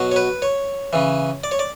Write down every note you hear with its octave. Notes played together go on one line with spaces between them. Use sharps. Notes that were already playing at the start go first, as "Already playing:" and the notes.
Already playing: B2 F#3
C#5
B4
C#5
C#3 E3
D5
C#5
D5